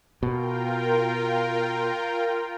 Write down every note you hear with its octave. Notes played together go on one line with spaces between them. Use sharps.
B2 F4 A#4 G5